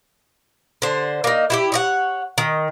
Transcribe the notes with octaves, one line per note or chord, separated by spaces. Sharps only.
D3 C5
A#3 D#4
E4 F#4 G4
C#5 D#5 F#5
D#3